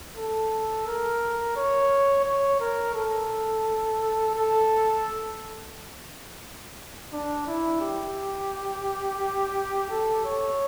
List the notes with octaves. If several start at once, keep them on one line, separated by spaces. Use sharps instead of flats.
A4
A#4
C#5
C#5
A#4
A4
A4
D4
E4
G4
A4
C#5